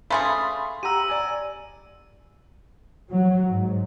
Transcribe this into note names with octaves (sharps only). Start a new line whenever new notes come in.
A3 C#4 G#4 F5 B5 C6 A6
G4 F#5 A#5 E6 D#7
D5 G#5 A#5
F#3
G#2